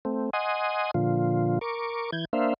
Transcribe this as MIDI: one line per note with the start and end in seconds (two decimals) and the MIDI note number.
0.05 0.30 57
0.05 0.30 60
0.33 0.91 75
0.33 0.91 78
0.33 0.91 80
0.33 0.91 84
0.33 0.91 87
0.94 1.59 46
0.94 1.59 50
0.94 1.59 53
0.94 1.59 65
1.61 2.11 70
1.61 2.11 85
1.61 2.11 86
2.12 2.25 52
2.12 2.25 91
2.12 2.25 92
2.33 2.54 58
2.33 2.54 62
2.33 2.54 72
2.33 2.54 76
2.33 2.54 77